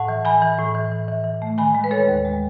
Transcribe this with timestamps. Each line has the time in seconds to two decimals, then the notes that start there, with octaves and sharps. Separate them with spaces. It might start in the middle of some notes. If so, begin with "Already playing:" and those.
Already playing: A2 F#5 A5
0.08 E3
0.25 E3 G#5 B5
0.42 E3
0.58 A2
0.75 E3
0.92 E3
1.08 E3
1.24 E3
1.42 A3
1.58 D#3 G#5 B5
1.75 G#3
1.84 B4
1.91 D#3 A4 C#5
2.08 D#2
2.25 G#3